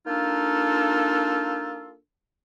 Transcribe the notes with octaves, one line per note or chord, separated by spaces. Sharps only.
A#3 D4 D#4 F4 A4